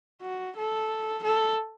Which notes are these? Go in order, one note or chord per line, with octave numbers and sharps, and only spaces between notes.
F#4
A4
A4